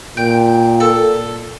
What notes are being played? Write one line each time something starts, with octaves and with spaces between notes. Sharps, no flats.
A#2 G5
A4